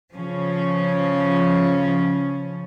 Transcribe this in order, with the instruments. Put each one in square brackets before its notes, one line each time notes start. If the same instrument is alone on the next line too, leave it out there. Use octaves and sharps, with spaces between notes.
[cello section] C#3 F3 C#4